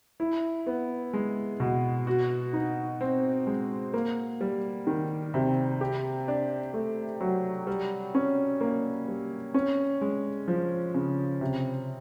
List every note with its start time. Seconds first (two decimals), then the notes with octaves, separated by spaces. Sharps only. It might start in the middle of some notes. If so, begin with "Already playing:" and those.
0.20 E4
0.66 B3
1.13 G#3
1.60 B2
2.07 F#4
2.53 D#4
3.01 C4
3.47 G#3
3.94 A#3
4.41 G3
4.87 D#3
5.34 C3
5.81 G4
6.28 D4
6.74 A3
7.21 F#3
7.67 G3
8.15 C#4
8.61 A#3
9.08 G3
9.54 C#4
10.01 G#3
10.48 F3
10.94 C#3
11.41 C3